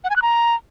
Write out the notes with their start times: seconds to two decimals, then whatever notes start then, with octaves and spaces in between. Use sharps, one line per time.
0.04 F#5
0.10 G#5
0.16 F#6
0.22 A#5